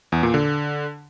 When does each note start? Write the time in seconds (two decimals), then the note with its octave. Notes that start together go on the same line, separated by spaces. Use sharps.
0.12 E2
0.23 A#2
0.34 D3